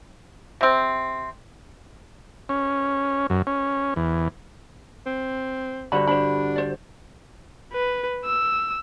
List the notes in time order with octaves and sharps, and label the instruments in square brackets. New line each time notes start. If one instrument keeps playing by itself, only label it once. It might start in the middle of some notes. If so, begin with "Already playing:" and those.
[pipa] C3 C4
[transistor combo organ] C#4
F#2
C#4
E2
[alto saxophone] C4
[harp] G2 D3 F#4 [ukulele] C5 B5
[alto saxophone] D4 [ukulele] C5 B5
[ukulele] C5 D5
[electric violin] B4
E6